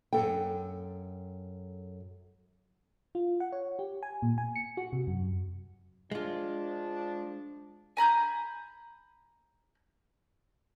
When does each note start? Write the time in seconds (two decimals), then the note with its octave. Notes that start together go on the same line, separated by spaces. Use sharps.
0.13 F#2 C#3 A4 G5
3.15 F4
3.40 F#5
3.52 C#5
3.79 G4
4.03 G#5
4.22 A#2
4.38 G#5
4.56 C#7
4.77 F#4
4.93 C3
5.07 F#2
6.11 F3 G#3 D4 F4
7.97 G#5 A#5 B5 G6